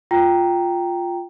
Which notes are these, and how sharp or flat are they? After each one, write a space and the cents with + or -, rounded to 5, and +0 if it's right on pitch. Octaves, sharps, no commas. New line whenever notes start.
F4 +0 G5 +0 A#5 +0